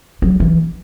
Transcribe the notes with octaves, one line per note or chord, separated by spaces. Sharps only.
F#3
E3